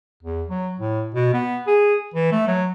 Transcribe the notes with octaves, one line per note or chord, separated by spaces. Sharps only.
E2
F#3
A2
B2
B3
G#4
E3
A3
F#3